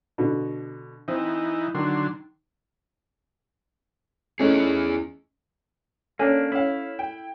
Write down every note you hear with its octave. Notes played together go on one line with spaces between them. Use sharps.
B2 D3
E3 C4 D#4
D3 D#3 F#3 C6
E2 A3 C#4 D#4 E4 G#4
A#3 C#4 D4 A4 G#5
C#4 E4 F5
G5